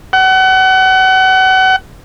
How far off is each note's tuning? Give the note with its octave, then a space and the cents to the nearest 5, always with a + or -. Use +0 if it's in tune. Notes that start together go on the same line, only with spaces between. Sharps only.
F#5 +35